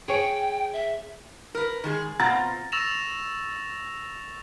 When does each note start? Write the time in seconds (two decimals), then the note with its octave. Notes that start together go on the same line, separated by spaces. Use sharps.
0.08 G#4 C#5 G5 D7
0.73 E5
1.55 A#4 B4
1.84 D#3 G#3 G#4
2.19 B2 C4 F4 F#5 A#5 A6
2.72 C#6 E6 A6 A#6 E7 F7